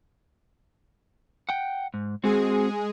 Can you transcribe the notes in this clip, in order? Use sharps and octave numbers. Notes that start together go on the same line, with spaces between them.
F#5 G5
G#2
G#3 C4 F#4 G#4